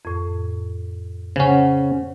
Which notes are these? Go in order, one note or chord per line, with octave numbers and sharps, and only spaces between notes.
F2 A2
C#3 C#4 C5 F#5